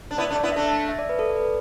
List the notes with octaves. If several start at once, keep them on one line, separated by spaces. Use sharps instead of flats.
D4
B3 E4 D5
A3 D4
D5
B3 E4
A3 D4 E5
E5
D5
B4
A4
D5
B4